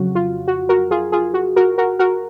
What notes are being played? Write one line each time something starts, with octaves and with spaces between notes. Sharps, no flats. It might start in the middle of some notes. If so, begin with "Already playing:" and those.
Already playing: F2 C#3 F#3 F#4
F4
F#4
F#4 A#4
F4 G#4
F4 G#4
F#4
F#4 A#4
F#4 A#4
F#4 A#4